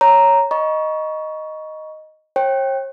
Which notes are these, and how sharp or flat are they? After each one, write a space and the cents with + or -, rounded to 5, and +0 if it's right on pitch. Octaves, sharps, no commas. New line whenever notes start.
C#5 +0 A#5 +0
D#5 +0 A#5 +40 C#6 +10
C#5 -45 G5 +0